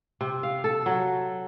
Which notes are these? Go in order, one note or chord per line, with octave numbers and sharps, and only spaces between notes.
C3
F5
A4
F#3